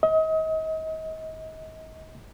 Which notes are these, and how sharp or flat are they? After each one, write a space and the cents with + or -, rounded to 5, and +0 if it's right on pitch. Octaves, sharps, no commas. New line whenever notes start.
D#5 +35